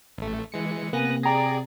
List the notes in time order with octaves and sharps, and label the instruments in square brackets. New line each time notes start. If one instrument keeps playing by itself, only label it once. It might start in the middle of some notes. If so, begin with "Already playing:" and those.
[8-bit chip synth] A1 A3
E3 G#3 C#7
[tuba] C3 [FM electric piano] A#3 [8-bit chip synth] B3 F#6 A#6 [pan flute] G#5
[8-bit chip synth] G#4 D5 [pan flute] G5 [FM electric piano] A#5 A#6